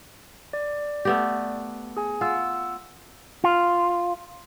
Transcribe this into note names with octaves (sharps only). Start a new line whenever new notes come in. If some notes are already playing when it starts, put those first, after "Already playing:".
D5
A3 B3 G4
G#4 G#5
F4 F#5 E6
F4